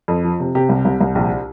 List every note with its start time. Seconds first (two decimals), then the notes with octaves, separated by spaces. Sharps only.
0.08 F2
0.24 F3
0.40 C3
0.55 C3 G4
0.69 C2
0.85 C2
1.01 C2
1.15 A#1